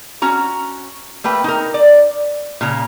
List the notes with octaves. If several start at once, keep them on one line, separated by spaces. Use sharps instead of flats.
C#4 F#4 A#5
A3 A#3 B4 G5
D#4 A#4
D5
A#2 C#3 A#5